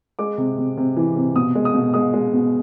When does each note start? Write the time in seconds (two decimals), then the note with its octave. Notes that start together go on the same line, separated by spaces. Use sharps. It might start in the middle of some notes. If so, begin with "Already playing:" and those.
0.19 G#3 D6
0.38 C3
0.58 C3
0.77 C3
0.96 E3
1.16 C3
1.36 B2 D#6
1.55 G#3
1.65 D#6
1.74 B2
1.94 G#3 D#6
2.14 G#3
2.33 B2